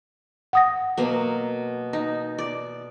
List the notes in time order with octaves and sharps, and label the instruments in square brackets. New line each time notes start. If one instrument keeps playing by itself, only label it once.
[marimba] F#5 D#6 A#6
[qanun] B2 F#3 A#3
D#4
D5